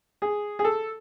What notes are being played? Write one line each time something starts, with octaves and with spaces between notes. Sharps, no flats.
G#4
G#4
A4